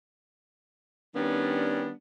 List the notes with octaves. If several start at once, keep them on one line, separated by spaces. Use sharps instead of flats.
D#3 G3 B3 C#4 D4